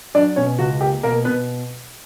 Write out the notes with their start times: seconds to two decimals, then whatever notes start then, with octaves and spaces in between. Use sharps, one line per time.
0.14 F#3 D4 D5
0.36 B2 C#4 C#5
0.59 C#2 F#4
0.81 A#3 G4
1.03 B2 A#3 A#4
1.25 B2 B3 B4